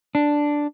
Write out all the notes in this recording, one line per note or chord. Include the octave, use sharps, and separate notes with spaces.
D4